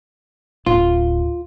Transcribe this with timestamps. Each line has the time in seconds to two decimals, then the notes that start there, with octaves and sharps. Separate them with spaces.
0.66 D1 F4